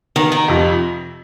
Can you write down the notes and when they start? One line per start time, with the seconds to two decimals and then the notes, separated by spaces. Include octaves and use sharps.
0.16 D#3
0.32 D#3
0.48 F2 C3 F3